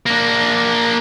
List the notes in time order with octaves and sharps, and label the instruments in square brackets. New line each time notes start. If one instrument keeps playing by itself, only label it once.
[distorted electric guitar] A#3 D4